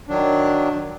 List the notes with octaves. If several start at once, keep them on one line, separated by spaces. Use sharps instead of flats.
D#3 F#3 D4